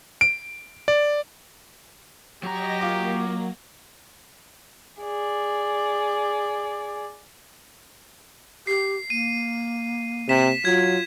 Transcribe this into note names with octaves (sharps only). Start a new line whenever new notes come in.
D7
D5
F#3 G4 D#5 A#5 A#6
A#3 F4 D6
G#4 D5
G4 C7
A#3 D#7
C3 B6 E7
F#3 F4 G#6